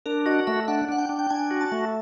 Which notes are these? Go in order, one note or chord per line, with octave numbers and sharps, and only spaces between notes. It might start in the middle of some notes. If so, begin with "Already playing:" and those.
D4 A#4
F#4 D#5
A3 E5
D4 F#5
D4 F#5
G5
D4
G5
D4 G#5
F#4
A5
A3